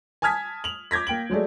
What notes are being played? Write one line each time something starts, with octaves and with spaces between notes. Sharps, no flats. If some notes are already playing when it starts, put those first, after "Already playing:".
G#5 A5 D#6 F6 G#6 B6
F7 F#7
D6 G6 G#6 A#6 B6
A#3 G5 D7 F#7
F#3 G#3 A3 D5